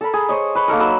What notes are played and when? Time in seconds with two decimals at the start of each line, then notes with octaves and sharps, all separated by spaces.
0.01 A4 A#4 B5
0.14 G#4
0.29 C5 C#5 D#5
0.55 B4 C#5
0.68 A#3 D#4 A4 A#4
0.80 F#3 B4 E6